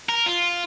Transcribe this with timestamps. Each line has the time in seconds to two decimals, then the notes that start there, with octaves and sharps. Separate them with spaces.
0.09 A#4
0.26 F4